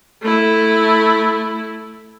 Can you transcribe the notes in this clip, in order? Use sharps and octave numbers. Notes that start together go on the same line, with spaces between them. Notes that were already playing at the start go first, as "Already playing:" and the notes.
A3 E4